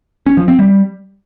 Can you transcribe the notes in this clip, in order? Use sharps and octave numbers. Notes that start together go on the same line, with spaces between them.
C#4
F3
C4
G3